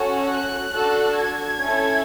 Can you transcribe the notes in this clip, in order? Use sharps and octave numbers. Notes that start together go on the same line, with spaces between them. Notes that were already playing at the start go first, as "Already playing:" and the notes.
Already playing: C#4 F#4 A4
F#6
D4 F#4 A4
G#6
C#4 E4 A4